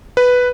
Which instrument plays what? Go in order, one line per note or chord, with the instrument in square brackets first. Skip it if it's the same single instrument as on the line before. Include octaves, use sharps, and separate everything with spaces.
[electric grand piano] B4